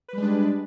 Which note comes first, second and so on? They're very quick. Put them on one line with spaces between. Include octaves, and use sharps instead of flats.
B4 G3 G#3 D4